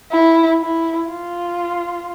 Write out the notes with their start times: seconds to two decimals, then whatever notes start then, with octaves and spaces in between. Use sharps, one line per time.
0.12 E4
0.61 E4
1.10 F4